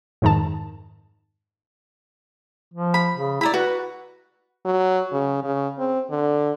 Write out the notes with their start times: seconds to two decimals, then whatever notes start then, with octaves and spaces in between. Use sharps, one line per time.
0.22 F2 G#2 D#3 A5
2.74 F3
2.94 B5
3.15 C#3
3.41 E4 D5 A#5 B5
3.54 F#4 B4
4.65 F#3
5.12 C#3
5.44 C#3
5.79 C4
6.10 D3